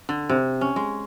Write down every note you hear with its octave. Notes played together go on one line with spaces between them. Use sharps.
D3
C3
C#4
G#3